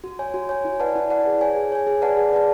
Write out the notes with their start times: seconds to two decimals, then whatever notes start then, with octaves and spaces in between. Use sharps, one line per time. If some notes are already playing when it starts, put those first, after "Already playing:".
0.04 F#4
0.19 C#5 G#5
0.34 F#4
0.49 C#5 G#5
0.65 E4
0.80 B4 D5 F#5 A5
0.96 E4
1.10 B4 D5 F#5 A5
1.26 G#4
1.41 C#5 G#5
1.56 G#4
1.72 C#5 G#5
1.87 G#4
2.02 B4 D5 F#5 A5
2.17 G#4
2.32 B4 D5 F#5 A5